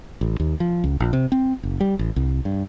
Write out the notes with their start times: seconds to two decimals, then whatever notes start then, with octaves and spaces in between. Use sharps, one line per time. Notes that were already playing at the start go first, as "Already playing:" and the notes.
0.21 A1
0.40 D#2
0.60 F3
0.84 C#2
1.00 A#1
1.13 C3
1.32 C4
1.63 F#1
1.81 G3
1.99 A1
2.16 C2
2.45 G2